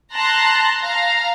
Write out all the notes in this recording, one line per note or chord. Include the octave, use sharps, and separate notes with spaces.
A5 A#5 C6 F#6
F5 A#5